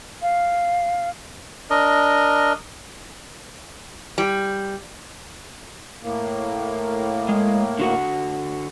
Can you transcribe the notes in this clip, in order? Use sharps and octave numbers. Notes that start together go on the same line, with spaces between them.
F5
D4 A#4 D#5
G3
A2 A#3
G#3
D3 F#4 F#5